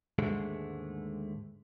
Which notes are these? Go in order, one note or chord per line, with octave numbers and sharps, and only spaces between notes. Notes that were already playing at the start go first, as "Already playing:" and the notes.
D#2 G#2 D3 G#3 A3